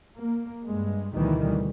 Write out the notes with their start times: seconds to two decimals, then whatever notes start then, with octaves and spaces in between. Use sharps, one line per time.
0.17 A#3
0.65 G2 G#3
1.15 D2 B2 D#3 E3 G3